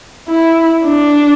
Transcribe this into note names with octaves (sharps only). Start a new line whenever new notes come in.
E4
D4